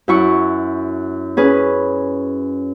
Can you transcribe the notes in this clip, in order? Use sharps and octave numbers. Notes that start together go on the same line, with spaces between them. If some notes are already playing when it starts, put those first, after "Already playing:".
F#2 E4 C#6
C#4 G#4 B4